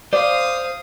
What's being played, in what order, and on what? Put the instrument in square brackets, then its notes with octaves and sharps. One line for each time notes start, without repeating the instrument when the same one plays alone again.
[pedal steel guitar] C5 C6 [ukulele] D5 [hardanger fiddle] F5 D#6